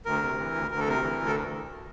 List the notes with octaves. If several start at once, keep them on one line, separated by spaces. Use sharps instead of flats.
D2 A#4
C3
E3
D2
D2 A#4
A4
C3 A#4
E3
D2
A4